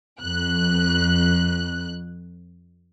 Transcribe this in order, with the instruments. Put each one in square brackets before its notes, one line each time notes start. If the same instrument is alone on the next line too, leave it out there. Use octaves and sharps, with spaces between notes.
[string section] F2 F#6